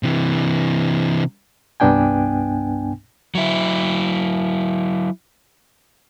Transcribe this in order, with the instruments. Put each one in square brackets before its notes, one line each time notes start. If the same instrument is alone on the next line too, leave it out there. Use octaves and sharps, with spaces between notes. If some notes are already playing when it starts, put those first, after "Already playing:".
[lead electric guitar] C3 E3
[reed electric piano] C2 G2 B3 D4 G5 G#5
[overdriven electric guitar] F#3 E4